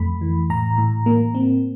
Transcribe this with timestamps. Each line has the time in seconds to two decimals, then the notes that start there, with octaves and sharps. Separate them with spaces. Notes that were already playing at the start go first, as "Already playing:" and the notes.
Already playing: F2 A3 B5
0.21 E3
0.50 A2 A#5
0.78 A2
1.06 A#3
1.35 C4